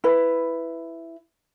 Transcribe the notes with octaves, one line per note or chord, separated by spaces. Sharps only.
E4 B4